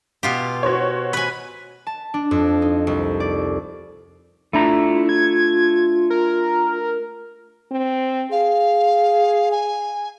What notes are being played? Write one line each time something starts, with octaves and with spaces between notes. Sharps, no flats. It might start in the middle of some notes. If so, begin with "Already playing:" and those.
B2 F4 G4
F#4 C5 C#5
B4 G#5
A5
D4
F2
D#4
C2
D5
A3 D4 E4 F4 A#5
G#6
A#4
C4
G#4 F5
G#5